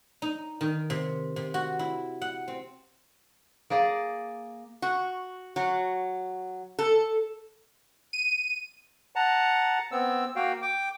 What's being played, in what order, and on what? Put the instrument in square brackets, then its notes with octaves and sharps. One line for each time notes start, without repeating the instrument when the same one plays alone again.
[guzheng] D#4
D#3
C3
C3
F#4
E4
F#5
C4
[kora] A#3 G#4 D5
[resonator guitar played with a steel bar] F#4
F#3
A4
[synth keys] D#7
[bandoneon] F#5 A5 A#5
B3 C4 E6
A#3 F#4 F5 G5
G5 D6